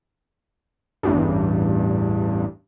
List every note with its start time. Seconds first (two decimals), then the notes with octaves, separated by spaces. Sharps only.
1.03 A1 E2 G2